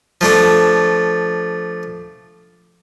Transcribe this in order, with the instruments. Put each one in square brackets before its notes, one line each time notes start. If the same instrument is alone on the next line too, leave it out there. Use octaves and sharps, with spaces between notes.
[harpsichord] F3 A3 D4